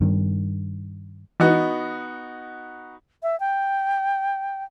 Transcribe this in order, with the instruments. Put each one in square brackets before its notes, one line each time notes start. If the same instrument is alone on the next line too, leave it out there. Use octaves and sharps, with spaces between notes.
[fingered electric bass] G2 D#3
[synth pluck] E3 [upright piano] B3 D#4 F#4
[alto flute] E5
G5